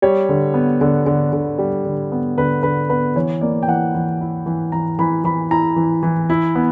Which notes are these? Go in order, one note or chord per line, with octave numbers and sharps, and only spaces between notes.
G3 C#5
D3
B3
D3
D3
D3
G3
D3
B3
D3 B4
D3 B4
B3 B4
E3 C#5
A#3 D5
G5
E3 F#5
E3
E4
E3
E3 A#5
E3 B5
E3 B5
E4 A#5
E3
E3
E4
B3